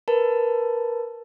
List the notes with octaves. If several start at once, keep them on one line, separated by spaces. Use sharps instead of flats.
A#4 B4 A5